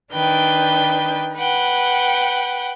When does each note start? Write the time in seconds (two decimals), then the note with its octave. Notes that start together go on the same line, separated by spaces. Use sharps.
0.13 D#3 D4 B4 G5 G6
1.34 B4 F#5 G5